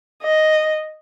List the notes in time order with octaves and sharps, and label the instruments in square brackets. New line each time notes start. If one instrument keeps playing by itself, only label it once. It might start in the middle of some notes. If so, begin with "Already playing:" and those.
[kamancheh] D#5